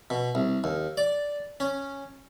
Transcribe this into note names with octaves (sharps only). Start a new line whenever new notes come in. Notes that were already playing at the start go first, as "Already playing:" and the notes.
B2
C2
D#2
D5
C#4